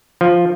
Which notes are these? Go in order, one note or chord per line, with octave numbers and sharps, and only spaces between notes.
F3